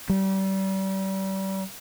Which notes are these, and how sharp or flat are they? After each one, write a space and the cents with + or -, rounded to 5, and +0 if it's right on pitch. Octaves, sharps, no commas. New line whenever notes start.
G3 -30